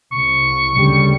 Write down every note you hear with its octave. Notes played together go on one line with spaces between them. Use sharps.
C2 C#6
D2 C#3 G3